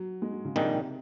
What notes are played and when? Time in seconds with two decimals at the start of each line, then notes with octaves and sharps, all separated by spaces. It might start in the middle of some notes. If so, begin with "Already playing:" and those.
Already playing: F#3
0.22 G#3
0.32 F#3
0.45 C#3
0.55 A#1 G#2 C3 D#3 G3